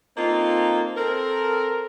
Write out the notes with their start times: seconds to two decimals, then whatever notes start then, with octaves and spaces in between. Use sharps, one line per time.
0.18 A#3 C4 D#4 F4 A4
0.97 C4 A4 A#4